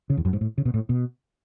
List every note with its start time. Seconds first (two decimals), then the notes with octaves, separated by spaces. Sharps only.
0.10 C#3
0.17 E2
0.25 F#2
0.33 G#2
0.41 A2
0.58 C#3
0.65 B2
0.74 A2
0.89 B2